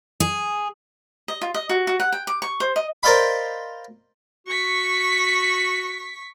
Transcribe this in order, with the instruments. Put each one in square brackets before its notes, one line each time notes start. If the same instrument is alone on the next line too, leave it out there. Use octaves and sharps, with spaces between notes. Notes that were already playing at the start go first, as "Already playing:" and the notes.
[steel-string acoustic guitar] G#4
[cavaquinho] D#5
F4
D#5
F#4
F#4
F#5
G5
D6
C#6
C5
D#5
[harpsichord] A#4 C5 D5 D#5 F5 B5
[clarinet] F#4 [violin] C#6 B6